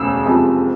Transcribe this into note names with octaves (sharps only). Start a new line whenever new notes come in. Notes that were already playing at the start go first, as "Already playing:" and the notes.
Already playing: E1 D2 C#3 E6
F#1 F2 C3 F3 G#3